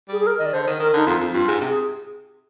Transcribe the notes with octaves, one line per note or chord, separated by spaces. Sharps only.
G3 G#4
G#4
A#4
D#3 D#5
D5
D3 C5
D#3
D#3 A#4
D3 D#4
F2 F4
F2
G2 F4
G#2
C3
G#4